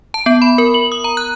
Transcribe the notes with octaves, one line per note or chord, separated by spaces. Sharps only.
A5
B3
B5
A#4
F#7
D#6
A#5
F#6